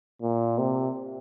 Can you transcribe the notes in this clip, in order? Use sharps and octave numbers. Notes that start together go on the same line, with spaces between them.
A#2
C3